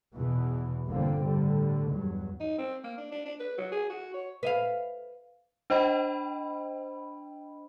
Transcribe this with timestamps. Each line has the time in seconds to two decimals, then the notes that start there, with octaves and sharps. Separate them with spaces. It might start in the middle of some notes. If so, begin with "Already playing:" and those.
0.15 E2 B2 E3
0.87 G1 E2 D3 A#3 C4
1.24 A2 D3 G3
1.90 E2 G2 F#3
2.40 D#4
2.59 C4
2.84 A#3
2.98 D4
3.12 D4
3.26 D4
3.40 B4
3.58 F#3
3.72 G#4
3.90 F#4
4.14 C#5
4.43 B4 E5 F5
5.70 D4 C5 D#5 G5 B5